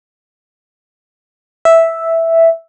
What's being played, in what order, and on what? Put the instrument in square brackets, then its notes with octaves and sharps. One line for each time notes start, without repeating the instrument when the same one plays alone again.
[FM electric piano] E5